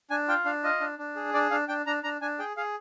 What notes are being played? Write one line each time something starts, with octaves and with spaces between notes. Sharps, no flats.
D4 G#5
F4 G5
D4 F5
F4 D#5
D4
D4
G#4
D4 D5
D4 F5
D4 G5
D4 A#5
D4 A#5
D4 G#5
G#4 G5
G#4 F5